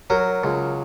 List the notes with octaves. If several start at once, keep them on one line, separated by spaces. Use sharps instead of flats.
F#3 A#4
C#2